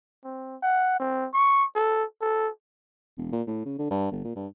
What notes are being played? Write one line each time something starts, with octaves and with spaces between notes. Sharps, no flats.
C4
F#5
C4
C#6
A4
A4
E1
A#2
A2
C#3
D3
G2
G1
A#2
G2